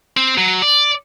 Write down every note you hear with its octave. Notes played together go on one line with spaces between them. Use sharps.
C4
F#3
D5